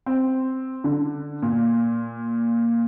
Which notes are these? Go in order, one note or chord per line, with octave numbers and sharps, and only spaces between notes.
C4
D3
A#2